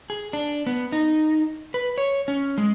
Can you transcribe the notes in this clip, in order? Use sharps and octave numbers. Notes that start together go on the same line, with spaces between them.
G#4
D4
B3
D#4
B4
C#5
C#4
G#3